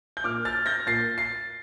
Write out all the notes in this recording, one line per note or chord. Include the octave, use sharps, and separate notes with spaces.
G6
A#2 D6 F6
F6 A6
G6 A#6
A#2 A6 C7
A6 C7